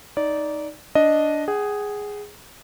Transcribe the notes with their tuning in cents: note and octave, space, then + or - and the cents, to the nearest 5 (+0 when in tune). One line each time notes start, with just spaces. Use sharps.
D#4 +0 D5 -15
D4 -5 D#5 +0
G#4 -5 F#5 +40